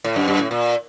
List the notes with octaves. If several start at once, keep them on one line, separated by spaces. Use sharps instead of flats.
A2
F#2
F#2
A2
A#2